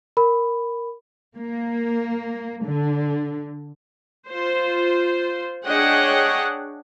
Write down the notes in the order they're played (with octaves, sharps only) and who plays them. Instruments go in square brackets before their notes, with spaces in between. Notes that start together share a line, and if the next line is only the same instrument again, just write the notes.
[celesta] A#4 B5
[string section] A#3
D3
[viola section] F4 C5
D4 G#4 C#5 D#5 F#5 G5